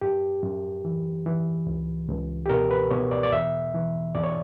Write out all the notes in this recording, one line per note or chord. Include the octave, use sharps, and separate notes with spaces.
F#2 G4
F#2
E3
E3
C#2
C#2
G4
B2 A#4
B4
B2 C#5
D5
D5
E2 E5
E3
E2 D5
C#5